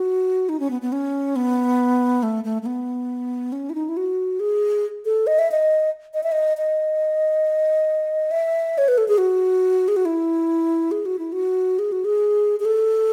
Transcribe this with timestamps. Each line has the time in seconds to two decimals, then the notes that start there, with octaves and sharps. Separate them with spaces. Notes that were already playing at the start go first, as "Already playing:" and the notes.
Already playing: F#4
0.49 D#4
0.60 C#4
0.70 B3
0.82 B3
0.92 C#4
1.36 B3
2.23 A3
2.44 A3
2.62 A3
2.66 B3
3.52 C#4
3.70 E4
3.75 D#4
3.89 E4
3.97 F#4
4.40 G#4
5.05 A4
5.27 D#5
5.39 E5
5.52 D#5
6.14 D#5
6.23 E5
6.32 D#5
6.57 D#5
8.31 E5
8.78 C#5
8.88 B4
8.98 A4
9.08 G#4
9.18 F#4
9.88 G#4
9.96 F#4
10.05 E4
10.91 G#4
11.06 F#4
11.19 E4
11.32 F#4
11.79 G#4
11.92 F#4
12.05 G#4
12.60 G#4
12.65 A4